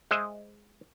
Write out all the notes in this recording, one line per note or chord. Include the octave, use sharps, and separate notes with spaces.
G#3 C5 D#5 E5